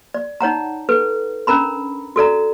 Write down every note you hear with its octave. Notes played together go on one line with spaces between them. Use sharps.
D5
D#4 C#5 F#5 A#5
A4 B4
C#4 D4 A#4 A#5 B5
F#4 A4 D5 A#5